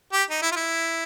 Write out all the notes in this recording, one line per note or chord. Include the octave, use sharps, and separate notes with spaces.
G4
D#4
E4
F4
E4